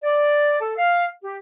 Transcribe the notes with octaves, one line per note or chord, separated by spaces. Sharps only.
D5
A4
F5
G4